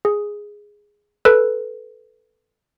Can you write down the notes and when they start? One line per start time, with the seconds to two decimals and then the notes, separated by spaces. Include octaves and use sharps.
0.05 G#4
1.25 A4 B4